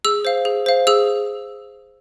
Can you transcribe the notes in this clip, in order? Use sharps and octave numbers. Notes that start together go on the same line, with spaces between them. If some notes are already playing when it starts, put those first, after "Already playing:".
G#4 E6
C5 F5
G#4
C5 F5
G#4 E6